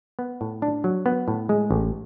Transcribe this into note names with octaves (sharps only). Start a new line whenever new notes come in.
B3
A2
D4
F#3
B3
A2
G#3
A1